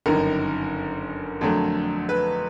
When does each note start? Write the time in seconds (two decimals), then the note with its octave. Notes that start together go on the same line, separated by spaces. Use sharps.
0.06 G1 F#2 D#3 A#4
1.41 F2 D3 F#3 A3
2.09 B4